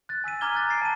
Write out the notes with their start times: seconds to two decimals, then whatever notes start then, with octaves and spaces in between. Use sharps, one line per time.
0.09 F#6 A6
0.24 G#5 E6 B6 D#7
0.41 A#5 D6 F6 G#6 G7
0.56 F#6 A6
0.70 A6 C7 D7
0.82 A5 D#7